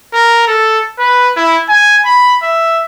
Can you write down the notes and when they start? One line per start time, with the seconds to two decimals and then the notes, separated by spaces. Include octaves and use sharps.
0.13 A#4
0.48 A4
0.99 B4
1.37 E4
1.69 G#5
2.06 B5
2.43 E5